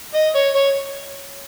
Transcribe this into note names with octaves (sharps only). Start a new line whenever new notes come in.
D#5
C#5
C#5